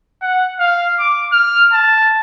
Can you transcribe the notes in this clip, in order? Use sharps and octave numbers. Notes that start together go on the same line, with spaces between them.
F#5
F5
D6
F6
A5